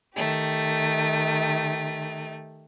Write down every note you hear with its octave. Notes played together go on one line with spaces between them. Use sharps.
D#3 A3 G4